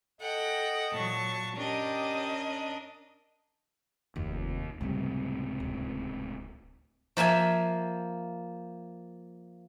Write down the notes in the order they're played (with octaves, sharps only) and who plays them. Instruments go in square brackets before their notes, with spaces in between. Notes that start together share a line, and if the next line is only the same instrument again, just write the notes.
[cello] A4 [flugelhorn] D#5 [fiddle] F#5 G5
[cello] A#2 F#3 [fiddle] A5 C#6
[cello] C#4 D#5 [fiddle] D4 A#4 [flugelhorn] G4
[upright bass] F1 [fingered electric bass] D#2
[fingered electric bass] C#2 A2 C3 [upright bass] F#2 G3
[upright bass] D1
[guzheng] F3 A#3 E5 G#5